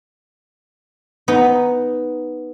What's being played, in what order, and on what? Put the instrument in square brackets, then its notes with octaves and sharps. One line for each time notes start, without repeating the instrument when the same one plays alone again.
[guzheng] B3 D#4